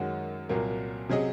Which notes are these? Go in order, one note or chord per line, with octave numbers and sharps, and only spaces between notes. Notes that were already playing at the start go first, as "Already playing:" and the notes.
Already playing: F#2 D#3 G#3 C#4 F#4
C2 A#2 F#3 A#3
C3 F#3 C#4 G#4 D#5